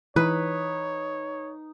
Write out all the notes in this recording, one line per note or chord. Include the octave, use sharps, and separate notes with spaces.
E3 D#4 B4 C#5